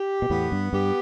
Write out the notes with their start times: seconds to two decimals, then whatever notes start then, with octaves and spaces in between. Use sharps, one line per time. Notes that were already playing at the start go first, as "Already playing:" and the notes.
Already playing: G4
0.22 B2
0.30 E2 A2 B3
0.52 G2
0.72 G2 G4